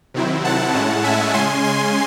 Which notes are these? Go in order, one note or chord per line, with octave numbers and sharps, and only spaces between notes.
C3 D#3 F#3 C4 E4
F#5 A5
A2 G#3 C#4 E4 F#5 A5
E5 G#5
C#3 G#3 C#4 G#5 C6
G#5 C6